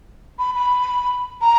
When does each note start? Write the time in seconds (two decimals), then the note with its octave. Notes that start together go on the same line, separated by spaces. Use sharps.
0.39 B5
0.55 B5
1.41 A#5